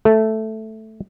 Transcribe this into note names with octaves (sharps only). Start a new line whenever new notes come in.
A3